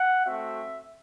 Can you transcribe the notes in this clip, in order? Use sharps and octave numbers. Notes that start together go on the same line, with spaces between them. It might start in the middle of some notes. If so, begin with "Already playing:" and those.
Already playing: F#5
A3 C4 F#4 E5